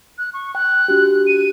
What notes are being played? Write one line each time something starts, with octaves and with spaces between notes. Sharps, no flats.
F#6
C#6
G5 F#6
D4 F#4 G4
D#7